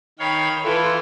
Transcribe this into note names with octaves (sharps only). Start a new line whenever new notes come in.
D#3 C#5 F5 G5 B5
E3 E4 F4 A4 B4